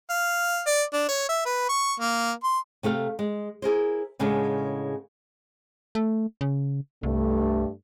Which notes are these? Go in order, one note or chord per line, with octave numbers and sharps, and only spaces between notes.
F5
D5
D4
C#5
E5
B4
C#6
A#3
C6
C3 A3 A4 F5
G#3
E4 G#4 A#4 C5
A2 C#3 G#3 A3 B3 D4
A3
C#3
C2 G2 A3